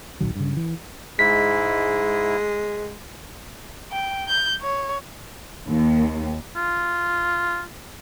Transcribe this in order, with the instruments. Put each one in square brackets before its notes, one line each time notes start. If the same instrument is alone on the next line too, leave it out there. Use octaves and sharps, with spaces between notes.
[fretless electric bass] D1 A#1 D#3 F#3
G2 C#3
E3
[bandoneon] G#2 E4 [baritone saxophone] G#3 [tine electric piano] B6
[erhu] G5
G6
C#5
[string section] D#2
[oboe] F4